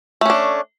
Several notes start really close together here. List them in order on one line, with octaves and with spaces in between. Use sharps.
A3 C#4 D4